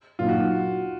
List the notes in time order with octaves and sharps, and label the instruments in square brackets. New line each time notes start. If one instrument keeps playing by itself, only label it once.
[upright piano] A#2 F#3 A#3 D#4 [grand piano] F4
[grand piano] F#4